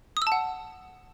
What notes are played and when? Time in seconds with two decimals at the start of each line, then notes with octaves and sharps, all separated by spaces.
0.17 D#6
0.22 E6
0.27 A5
0.32 F#5